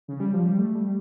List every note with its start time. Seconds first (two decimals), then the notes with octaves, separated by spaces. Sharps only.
0.08 C#3
0.20 G3
0.33 F3
0.46 G3
0.59 A3
0.75 G3